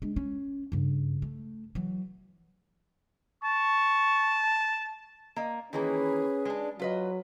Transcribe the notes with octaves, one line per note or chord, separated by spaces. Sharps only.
G#3 D4
C#4
G2 C#3
A3
E3 F#3
A5 C#6
A#3 D#5
D#3 E3 A#3 C#4 G#4 B4
G#3 D4
F#3 F4 B4 D#5